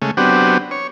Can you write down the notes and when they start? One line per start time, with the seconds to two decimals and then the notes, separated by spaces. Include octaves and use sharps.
0.02 C#3 G#3 A3
0.17 F#3 B3 C4 D4 G4
0.71 C#5